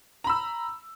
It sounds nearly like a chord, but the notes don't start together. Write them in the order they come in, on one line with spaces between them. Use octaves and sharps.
A#5 B5 E6